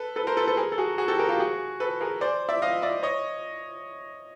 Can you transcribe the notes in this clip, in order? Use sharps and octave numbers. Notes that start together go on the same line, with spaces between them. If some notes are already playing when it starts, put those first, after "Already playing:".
Already playing: A4 B4
A4 B4
A#4 C5
A4 B4
A4 B4
G#4 A#4
A4
F#4 G#4
F#4 G#4
G4 A4
G#4 A#4
F4 G4
F#4 G#4
A4 B4
G#4 A#4
C5 D5
D5 E5
D#5 F5
D5 E5
C#5 D#5